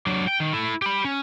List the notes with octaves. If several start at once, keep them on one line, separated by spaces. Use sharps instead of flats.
F#3 D4
G5
D#3
E4 A4
G4 B5
C#4